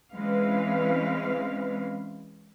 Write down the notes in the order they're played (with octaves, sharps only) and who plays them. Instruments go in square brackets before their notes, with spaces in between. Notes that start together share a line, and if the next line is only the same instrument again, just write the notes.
[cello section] E3 G#3 C4 C#4 B4 F5